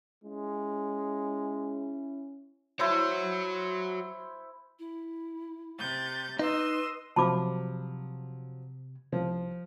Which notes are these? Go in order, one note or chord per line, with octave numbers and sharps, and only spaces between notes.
G#3 C#4 E4
E4 F#4 C5 C#5
E4
C3 G6 A6
D#4 B4 D#5 C6 E6
C3 F3 F#3 A5 B5 D6
C2 F3